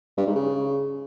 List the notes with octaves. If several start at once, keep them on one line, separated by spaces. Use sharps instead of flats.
G2
G#2
C#3